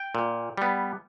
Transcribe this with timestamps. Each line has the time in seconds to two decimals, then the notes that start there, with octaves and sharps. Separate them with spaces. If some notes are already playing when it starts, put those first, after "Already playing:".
Already playing: G5
0.15 A#2
0.57 G3 B3